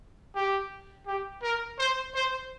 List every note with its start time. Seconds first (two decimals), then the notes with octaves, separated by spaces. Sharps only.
0.35 G4
1.06 G4
1.42 A#4
1.78 C5
2.14 C5